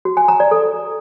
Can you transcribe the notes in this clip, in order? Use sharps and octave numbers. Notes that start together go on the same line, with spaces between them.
F#4
G#5
A#5
D5
A4